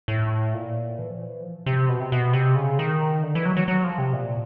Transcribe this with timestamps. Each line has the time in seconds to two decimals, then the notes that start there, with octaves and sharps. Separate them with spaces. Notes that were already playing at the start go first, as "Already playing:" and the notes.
0.08 A2
0.54 A#2
0.99 E3
1.10 F3
1.22 E3
1.43 F3
1.66 C3
1.89 B2
2.00 C3
2.12 B2
2.33 C3
2.55 C#3
2.79 D#3
3.23 D3
3.35 E3
3.45 F#3
3.57 F#3
3.68 F#3
3.84 F3
3.98 C3
4.13 A#2